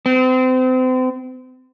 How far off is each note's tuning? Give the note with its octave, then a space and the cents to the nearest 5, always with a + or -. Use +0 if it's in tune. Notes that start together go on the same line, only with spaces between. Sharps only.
C4 -35